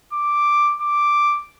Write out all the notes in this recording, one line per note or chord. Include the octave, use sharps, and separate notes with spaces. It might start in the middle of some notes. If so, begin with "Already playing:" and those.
D6
D6